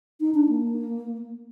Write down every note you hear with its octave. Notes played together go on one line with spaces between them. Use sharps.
D#4
D4
A#3